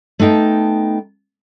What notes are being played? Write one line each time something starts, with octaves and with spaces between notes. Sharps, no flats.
A3 B3 D#4 G5 A5